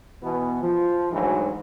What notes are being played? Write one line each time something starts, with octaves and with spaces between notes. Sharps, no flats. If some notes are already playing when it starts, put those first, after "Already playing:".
B2 E3 B3
F3
D2 G#2 E3 F#3